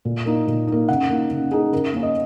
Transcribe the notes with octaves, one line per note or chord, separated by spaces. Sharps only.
A#2
A#3 D#4
A#2
A#3 D#4
C#3 F#5
A#3 D#4
C#3
A#3 D#4 G#4
C#3 A#4
A#3 C#4
D#5